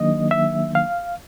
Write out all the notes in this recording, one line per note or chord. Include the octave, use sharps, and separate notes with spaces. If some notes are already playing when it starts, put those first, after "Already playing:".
Already playing: D#3 F#3 A#3 D4 D#5
E5
F5